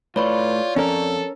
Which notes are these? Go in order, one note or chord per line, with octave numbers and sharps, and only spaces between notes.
A2 F4 B4 C#5 D5 C#6
F2 C#4 A4 A#4